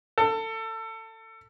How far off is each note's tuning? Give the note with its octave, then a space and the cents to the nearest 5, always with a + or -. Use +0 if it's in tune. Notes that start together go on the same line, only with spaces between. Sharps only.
A4 +25